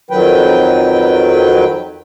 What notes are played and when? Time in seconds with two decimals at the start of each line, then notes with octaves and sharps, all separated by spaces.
0.11 F2 D#3 F#3 B4 G5